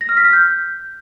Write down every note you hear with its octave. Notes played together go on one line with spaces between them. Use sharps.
A#6
F6
B6
F6
G6